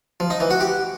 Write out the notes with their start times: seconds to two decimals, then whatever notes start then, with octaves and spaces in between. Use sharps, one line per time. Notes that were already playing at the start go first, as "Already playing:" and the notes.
0.20 F3
0.30 D#4
0.40 E3
0.50 F#4
0.61 G4